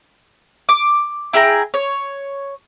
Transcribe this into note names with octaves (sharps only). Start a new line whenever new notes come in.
D6
E4 G#4 G5 A#5
C#5